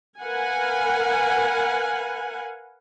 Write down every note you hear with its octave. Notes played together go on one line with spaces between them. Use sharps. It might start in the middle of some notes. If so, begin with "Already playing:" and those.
A#4 B4 F5 F#5 G#5